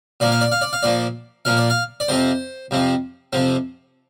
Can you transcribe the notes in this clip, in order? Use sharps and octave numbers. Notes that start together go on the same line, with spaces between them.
A#2 F3 A#3 D5
F5
D5
F5
D5
F5
A#2 F3 A#3 D5
A#2 F3 A#3 F5
D5
F5
D5
F2 C3 F3 C4 C5
F2 C3 F3 C4
F2 C3 F3 C4